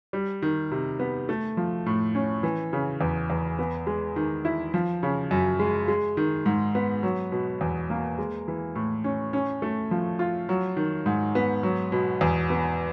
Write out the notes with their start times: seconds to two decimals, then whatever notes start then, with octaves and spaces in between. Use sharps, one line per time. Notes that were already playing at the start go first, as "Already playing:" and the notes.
0.13 G3
0.42 D#3
0.71 C3
1.00 B3
1.29 A3
1.57 F3
1.86 A2
2.15 C#4
2.43 E3
2.73 C#3
3.01 E2
3.30 E2
3.59 B3
3.87 G#3
4.16 D#3
4.45 E4
4.74 F3
5.03 C#3
5.31 F#2
5.59 G#3
5.88 G#3
6.17 D#3
6.46 G#2
6.75 B3
7.03 F#3
7.32 B2
7.61 E2
7.90 A#3
8.18 G#3
8.48 E3
8.75 A2
9.04 C#4
9.33 C#4
9.62 A3
9.91 F3
10.19 F4
10.49 F#3
10.77 D#3
11.06 G#2
11.35 B3
11.63 F#3
11.92 B2
12.21 E2
12.50 B3